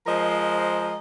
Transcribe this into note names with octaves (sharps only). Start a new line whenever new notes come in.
F3 G#3 A#4 C5 D#5